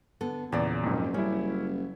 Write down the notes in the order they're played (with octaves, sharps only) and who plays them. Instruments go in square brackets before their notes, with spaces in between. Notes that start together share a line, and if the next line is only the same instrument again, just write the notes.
[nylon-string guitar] D3 B3 A4
[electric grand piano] E2 D5 [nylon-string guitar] A#2 C#3
[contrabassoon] F#1 [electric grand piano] F2 G#2
[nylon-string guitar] G3 [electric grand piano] C#4 E4